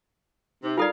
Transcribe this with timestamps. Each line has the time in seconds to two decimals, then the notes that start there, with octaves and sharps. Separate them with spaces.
0.63 C3 D#4
0.77 F4 A4 A#4 D5 F5